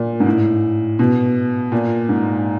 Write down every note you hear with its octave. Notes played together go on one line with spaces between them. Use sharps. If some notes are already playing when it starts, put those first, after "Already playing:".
Already playing: A#2
G#2
A2
B2
A#2
G#2